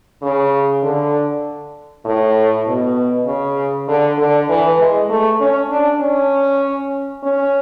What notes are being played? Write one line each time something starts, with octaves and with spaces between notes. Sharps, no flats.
C#3
D3
A2
B2
C#3
D3
D3
E3
G#3
A3
C#4
D4
C#4
C#4